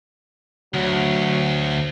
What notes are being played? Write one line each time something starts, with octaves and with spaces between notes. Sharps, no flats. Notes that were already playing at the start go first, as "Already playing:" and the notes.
D2 F#3